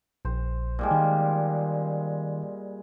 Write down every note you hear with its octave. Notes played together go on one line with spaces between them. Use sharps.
A#1 C5
A#2 G3 G#3
D#3